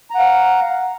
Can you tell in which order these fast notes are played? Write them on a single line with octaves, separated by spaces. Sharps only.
A#5 F#5 F5